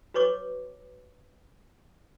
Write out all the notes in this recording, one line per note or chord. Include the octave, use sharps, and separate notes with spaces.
F#4 B4 C#5 C#6 D6